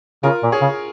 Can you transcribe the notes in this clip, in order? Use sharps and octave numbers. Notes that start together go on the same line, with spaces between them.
C#3 F4 A#4
A#2
G#4 C#5
C#3